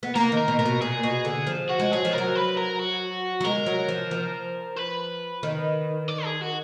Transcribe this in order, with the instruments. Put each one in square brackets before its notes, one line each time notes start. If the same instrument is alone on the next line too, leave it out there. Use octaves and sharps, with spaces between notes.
[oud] B3
[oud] A#3 [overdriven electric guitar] A#4
[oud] D#3
[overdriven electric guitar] A#4
[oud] B2
[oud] A#2 [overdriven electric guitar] A#4
[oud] B2
[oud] A#2 [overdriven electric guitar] G#4
[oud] B2
D3
F3
[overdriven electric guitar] F#4
[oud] G#3
[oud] F#3 [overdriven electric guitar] G#4
[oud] F3
[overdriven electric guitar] A#4
[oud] F#3
[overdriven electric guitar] B4
A#4
F#4
[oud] F#3
[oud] G#3 [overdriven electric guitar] A#4
[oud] F#3
F3
F3
[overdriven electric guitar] B4
[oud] D#3
[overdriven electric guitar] D5
G#4
F#4